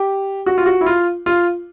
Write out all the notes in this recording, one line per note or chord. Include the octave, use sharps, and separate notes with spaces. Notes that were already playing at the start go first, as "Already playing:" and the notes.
Already playing: G4
F#4
F4
F#4
E4
F4
F4